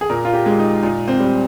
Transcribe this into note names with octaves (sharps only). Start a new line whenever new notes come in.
G#4
A#2 A#4
F4
G4
G#3
D#4
A#2 D#4
C4
G3